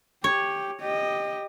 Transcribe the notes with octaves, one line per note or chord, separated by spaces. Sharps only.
G4 C#5
G4 D#5